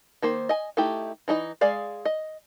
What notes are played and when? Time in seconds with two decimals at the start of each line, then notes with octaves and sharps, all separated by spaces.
0.22 D#3 A#3 C5
0.49 D#5 G#5
0.77 A3 D#4 E4 G4
1.28 E3 D#4 G#4 D#5
1.61 G#3 G#4 D5 F5
2.05 D#5